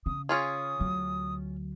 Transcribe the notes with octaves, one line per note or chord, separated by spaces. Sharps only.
C#3 D#6
C#4 F4 G#4 D#6
D2 F#3